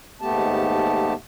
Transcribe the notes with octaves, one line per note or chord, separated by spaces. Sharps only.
D#2 G#2 A3 B3 G4 A5